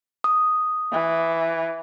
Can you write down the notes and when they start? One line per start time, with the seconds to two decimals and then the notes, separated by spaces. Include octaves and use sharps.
0.24 D#6
0.92 E3